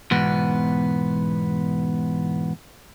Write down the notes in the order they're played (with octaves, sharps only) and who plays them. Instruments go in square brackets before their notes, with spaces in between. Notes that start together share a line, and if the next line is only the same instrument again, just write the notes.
[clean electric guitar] E2 G#2 B2 B3